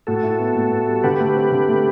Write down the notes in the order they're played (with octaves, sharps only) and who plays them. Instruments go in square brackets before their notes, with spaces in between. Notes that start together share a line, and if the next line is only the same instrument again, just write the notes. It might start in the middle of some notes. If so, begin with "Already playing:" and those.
[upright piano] A2 [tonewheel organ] F#4 A4
[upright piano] E4
B3
A2
B3
G3
[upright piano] D3 [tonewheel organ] G4 B4
[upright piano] A3
C4
D3
A3